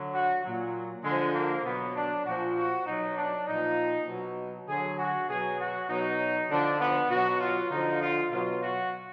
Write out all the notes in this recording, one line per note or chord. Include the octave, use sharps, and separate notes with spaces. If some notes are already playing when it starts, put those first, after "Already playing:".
Already playing: D3 F#3
F#4
A#2 F#3
D3 F3 G#3
A#3
B2 F#3 B3
D4
A#2 F3 F#4
F#4
B2 F#3 D#4
D4
A#2 F3 D#4
B2 F#3
D3 F#3 G#4
F#4
B2 F#3 G#4
F#4
B2 F#3 D#4
D3 F3 D4
B3
B2 F#3 F#4
F4
D3 F3 D#4
F4
B2 F#3 F4
F#4